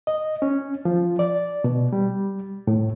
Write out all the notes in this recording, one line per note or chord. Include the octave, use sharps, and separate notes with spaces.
D#5
C#4
F3
D5
B2
G3
A2